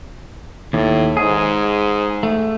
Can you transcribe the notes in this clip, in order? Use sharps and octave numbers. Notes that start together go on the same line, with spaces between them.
D#2 A2
G#2 G#4
A3